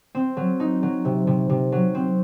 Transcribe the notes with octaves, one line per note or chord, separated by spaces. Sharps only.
C4
F#3
D#4
F#3
C3
C3
C3
F#3
C4